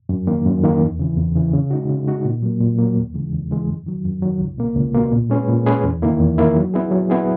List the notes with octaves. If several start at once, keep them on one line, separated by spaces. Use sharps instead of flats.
F#2
D#3 A#3
F#2
D#3 A#3
E2
C#3 E3
E2
C#3 E3
C#3
G#3 D#4 F#4
C#3
G#3 D#4 F#4
A#2
F#3 A#3
A#2
F#3 A#3
D#2
C#3 E3 G#3
D#2
C#3 E3 G#3
F#2
D#3 F#3
F#2
D#3 F#3
C#2
B2 A#3
C#2
B2 A#3
A#2
G#3 C#4 G#4 B4
A#2
G#3 C#4 G#4 B4
E2
D#3 A#3 E4
E2
D#3 A#3 E4
F#3
B3 E4 G#4
F#3
B3 E4 G#4